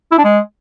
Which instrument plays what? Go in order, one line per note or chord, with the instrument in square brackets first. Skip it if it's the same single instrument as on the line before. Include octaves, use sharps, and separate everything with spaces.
[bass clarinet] E4
D4
G#3